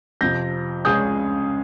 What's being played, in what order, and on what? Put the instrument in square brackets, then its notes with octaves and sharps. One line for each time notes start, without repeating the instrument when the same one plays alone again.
[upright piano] F2 C3 F3 C4 [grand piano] G6 A#6
[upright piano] C#2 C#3 G#3 C#4 G#4 [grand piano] D#6 G6